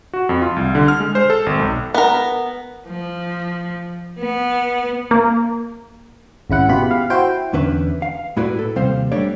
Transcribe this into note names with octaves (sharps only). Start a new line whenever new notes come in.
F#4
F2
F4
C2
D3
F6
G#3
C5
A4
G#1
B1
B3 A#4
F3
B3
A#3
G#1 C#3 E4 F#5
B2 F4 G4 B5
F5
E4 F#4 C5 G5
E2 D3 C#4 D4 B4 E5
F5
A2 E4 F#4 B4 D5
A4
D#2 C3 G3 C4 C5 F5
F#3 G3 A3 D4 C#5 D5